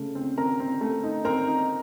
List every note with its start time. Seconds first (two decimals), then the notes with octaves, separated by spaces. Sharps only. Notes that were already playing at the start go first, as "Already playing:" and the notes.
Already playing: C#3 A3
0.15 C4
0.38 C4 A#4 A#5
0.60 C4
0.81 A3
1.03 D#4
1.25 C4 A#4 A#5
1.47 D#4